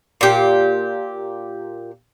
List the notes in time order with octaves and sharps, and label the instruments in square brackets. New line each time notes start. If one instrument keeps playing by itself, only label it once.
[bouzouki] A#2 G4